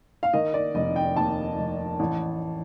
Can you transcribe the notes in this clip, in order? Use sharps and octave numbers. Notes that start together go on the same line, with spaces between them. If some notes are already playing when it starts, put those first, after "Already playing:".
F5
D#3 D#5
D5
F1 D#5
G5
D#2 A5
F1
A1